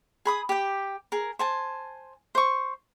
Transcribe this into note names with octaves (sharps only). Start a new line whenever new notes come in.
G#4 B5 D#6
G4 G5
G#4 A#4
C5 G#5 A5
C5 C#6